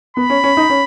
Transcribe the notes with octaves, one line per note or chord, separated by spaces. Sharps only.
B3 B5
C#4
C#4
D#4
C#4